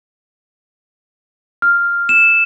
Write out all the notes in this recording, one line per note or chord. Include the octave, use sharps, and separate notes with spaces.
F6
E7